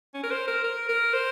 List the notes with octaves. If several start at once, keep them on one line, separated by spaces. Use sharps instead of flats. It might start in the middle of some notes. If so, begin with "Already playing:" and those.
C#4
A#4
C5
A#4
A#4
A#4
C5